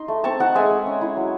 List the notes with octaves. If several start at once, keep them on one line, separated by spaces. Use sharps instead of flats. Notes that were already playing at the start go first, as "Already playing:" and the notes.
Already playing: D#4 C6
A3
C4 A5 C#6
D#4 F#5 A5
G#3 E5 G#5
G#3
C#4
E4
F#3